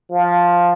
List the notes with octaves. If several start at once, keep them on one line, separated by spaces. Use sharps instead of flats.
F3